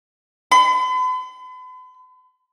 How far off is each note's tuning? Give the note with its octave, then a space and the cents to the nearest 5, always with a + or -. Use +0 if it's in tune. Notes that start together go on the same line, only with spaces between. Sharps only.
B5 +45